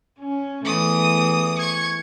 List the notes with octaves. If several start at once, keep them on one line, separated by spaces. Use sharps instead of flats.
C#4
E2 E3 A3 D#6
C#6 G#6